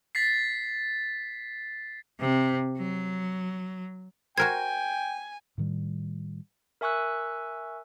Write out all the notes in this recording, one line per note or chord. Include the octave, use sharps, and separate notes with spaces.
A6 B6 C7
C3
F#3
F#4 A#4 C5 G5 G#5 G#6
A2 D#3 G3
A#4 E5 G#5 C#6 E6 F#6